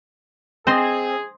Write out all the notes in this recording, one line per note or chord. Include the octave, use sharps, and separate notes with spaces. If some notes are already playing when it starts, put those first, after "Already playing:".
C4 G#4 C5 D#5 C6